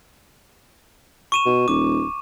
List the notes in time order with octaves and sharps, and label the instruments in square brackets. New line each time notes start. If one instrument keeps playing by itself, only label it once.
[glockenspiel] C#6 D#7 E7
[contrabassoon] B2
[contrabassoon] D#1 [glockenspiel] D6